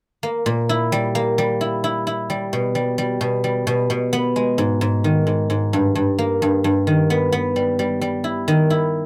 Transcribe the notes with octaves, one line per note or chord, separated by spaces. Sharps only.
A#3
A#2
E4
G3
A#3
G3
E4
E4
E4
G3
B2
G3
G3
B2
G3
B2
B2
B3
G#3
G#2
G#2
D#3
G#2
G#2
G2
G2
A#3
G2
G2
D#3
B3
B3
G3
G3
G3
E4
D#3
E4